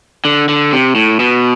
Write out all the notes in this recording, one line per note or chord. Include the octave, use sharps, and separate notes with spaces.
D3
D3
C3
A2
B2